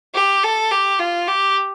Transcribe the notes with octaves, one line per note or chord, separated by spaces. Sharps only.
G4
A4
G4
F4
G4